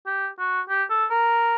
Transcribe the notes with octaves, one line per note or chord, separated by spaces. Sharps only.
G4
F#4
G4
A4
A#4